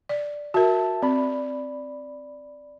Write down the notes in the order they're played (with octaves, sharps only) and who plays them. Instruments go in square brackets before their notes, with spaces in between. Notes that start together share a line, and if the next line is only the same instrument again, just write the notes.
[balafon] D5
[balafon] F#4 A#4 [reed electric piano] E5 A5
[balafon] C4 [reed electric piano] D5 B5